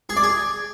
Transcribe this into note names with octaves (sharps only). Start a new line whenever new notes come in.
G#4
D5
G#4